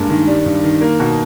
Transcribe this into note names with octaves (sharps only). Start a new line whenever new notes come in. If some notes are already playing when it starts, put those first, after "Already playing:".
Already playing: G2 G#3 A#3
D#3
G3
G2
D#3
A#3
B2